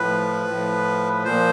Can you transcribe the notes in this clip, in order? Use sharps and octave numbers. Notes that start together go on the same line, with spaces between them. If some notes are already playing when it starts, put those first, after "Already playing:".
Already playing: A2 F3 B4
A2 F3
A#2 F3 C5